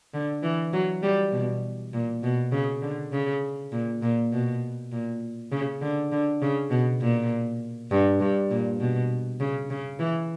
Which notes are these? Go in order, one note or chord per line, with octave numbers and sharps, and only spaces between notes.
D3
E3
F#3
G3
B2
A#2
B2
C#3
D3
C#3
A#2
A#2
B2
A#2
C#3
D3
D3
C#3
B2
A#2
G2
G2
A#2
B2
C#3
C#3
E3